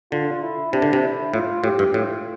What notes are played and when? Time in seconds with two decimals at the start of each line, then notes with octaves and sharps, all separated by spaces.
0.12 D3 F4
0.43 E4
0.72 C3 D4
0.82 D3
0.93 C3
1.03 E4
1.34 A2 F4
1.64 A2 G4
1.79 G2
1.94 A2 F4